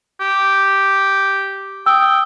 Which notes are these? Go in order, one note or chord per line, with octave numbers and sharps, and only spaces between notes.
G4
G5 D#6 E6